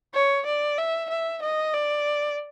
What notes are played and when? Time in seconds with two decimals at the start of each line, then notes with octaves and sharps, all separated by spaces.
0.14 C#5
0.46 D5
0.78 E5
1.10 E5
1.42 D#5
1.74 D5